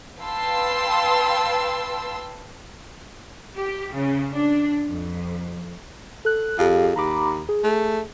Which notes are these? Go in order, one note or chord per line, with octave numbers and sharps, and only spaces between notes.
B4 F5 G5 A5 C6 E6
G4
C#3
D4
F2
A4 F#6
F2 G4 G#4 F5
D#2 A#5 B5 D6
G#4
A3